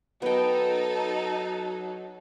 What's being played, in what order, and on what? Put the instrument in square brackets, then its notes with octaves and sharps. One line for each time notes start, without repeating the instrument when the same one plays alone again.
[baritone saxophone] F#3 [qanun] B3 G5 [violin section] D#4 A4